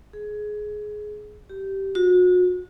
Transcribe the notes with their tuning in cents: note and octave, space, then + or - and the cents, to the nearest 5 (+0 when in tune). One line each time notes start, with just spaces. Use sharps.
G#4 +15
G4 -15
F#4 -35